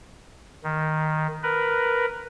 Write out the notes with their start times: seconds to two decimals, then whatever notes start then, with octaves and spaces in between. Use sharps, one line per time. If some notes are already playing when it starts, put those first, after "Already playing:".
0.64 D#3
1.43 A#4 B4